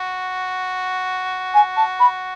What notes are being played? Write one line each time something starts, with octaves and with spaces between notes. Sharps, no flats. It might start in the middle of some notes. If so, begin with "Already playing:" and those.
Already playing: F#4
G#5
A5
B5